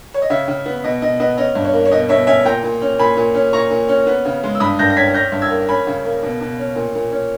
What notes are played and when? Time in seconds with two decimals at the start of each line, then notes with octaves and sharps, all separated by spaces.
0.14 C#5
0.22 D#5
0.30 C#3 C#5 E5
0.48 C#3
0.66 B3
0.84 B2 D#5
1.02 B2 D#5
1.20 B3 D#5
1.38 C#4 D#5
1.55 G2
1.65 C#5
1.73 A#3
1.85 C#5
1.92 B2 D#5
2.09 B2 C#5 E5
2.27 C#4 E5 G#5
2.45 A#2 G5 A#5
2.63 A#2
2.82 C#4
2.99 A#2 G#5 B5
3.17 A#2
3.35 C#4
3.53 A#2 A#5 C#6
3.71 A#2
3.89 C#4
4.07 B3
4.25 C#3
4.44 G#3
4.55 E6
4.60 G2 B5 D#6
4.79 G2 G6 A#6
4.90 A#6
4.96 C#4 G#6 B6
5.14 C#4 G6 A#6
5.32 G2
5.42 E6 G#6
5.51 A#3
5.69 C#4 G#5 B5
5.87 C#3
6.05 A#3
6.23 B2
6.41 B2
6.59 C#4
6.76 A#2
6.95 A#2
7.12 C#4